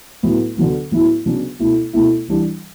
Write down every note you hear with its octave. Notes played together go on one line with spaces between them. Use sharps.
A2 F#3 B3 E4
D3 F#3 B3
A2 F#3 B3 E4
C#3 F#3 B3 D4
B2 A3 E4
B2 A3 E4
E3 G3 D4